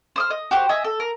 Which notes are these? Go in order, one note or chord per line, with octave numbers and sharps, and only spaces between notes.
C5 D#6 F6
D#5
F#4 G4 C5
D#5 E5 G#5
A4
A#4